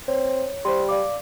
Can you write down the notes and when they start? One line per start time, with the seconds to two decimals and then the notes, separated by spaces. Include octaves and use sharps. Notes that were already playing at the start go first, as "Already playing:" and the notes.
0.08 C4 C#5
0.65 G3 C5 C6
0.89 D5 F5 D6